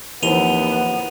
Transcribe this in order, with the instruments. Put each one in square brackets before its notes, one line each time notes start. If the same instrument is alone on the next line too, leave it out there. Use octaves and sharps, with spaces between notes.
[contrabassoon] D#2 [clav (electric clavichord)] E3 F3 C4 [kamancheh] B3 [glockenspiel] D#7 F7 G7